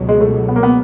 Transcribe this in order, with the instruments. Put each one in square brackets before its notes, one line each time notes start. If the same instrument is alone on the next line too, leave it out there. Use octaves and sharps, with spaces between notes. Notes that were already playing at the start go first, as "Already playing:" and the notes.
Already playing: [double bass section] C#2 B2 F#3
[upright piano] G#3
A3
B3
A#3
B3